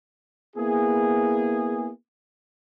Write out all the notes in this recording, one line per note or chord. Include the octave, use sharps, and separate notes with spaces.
A#3 B3 E4 G#4